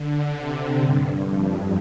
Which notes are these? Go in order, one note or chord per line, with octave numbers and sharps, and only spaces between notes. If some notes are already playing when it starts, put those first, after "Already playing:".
Already playing: D3
C3
G2
F2